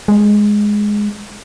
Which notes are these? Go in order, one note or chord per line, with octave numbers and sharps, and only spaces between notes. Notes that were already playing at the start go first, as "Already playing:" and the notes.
G#3